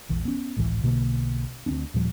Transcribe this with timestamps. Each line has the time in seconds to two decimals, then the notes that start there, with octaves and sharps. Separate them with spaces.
0.09 E1 A#1 E3
0.25 B3 C#4
0.57 G#1 C#2 A2 E3
0.83 B1 B2 D3 A#3
1.66 D2 G#3 C4 D4
1.94 D#2 A#2 F3 G3